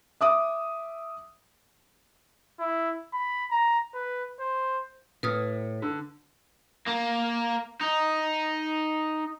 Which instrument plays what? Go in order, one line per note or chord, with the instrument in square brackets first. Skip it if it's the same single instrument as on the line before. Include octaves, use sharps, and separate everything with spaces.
[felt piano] E5 D6 D#6
[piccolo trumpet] E4
B5
A#5
B4
C5
[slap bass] A2 [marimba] B4 D#6 F6
[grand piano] D3
[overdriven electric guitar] A#3
D#4